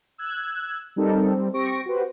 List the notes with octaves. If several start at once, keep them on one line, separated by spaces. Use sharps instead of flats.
E6 F#6 G#6
G3 C4 D#4 G4 A4 A#4
G3 C4
C4 G4 C#6 A#6 D7
F#4 G4 B4 C5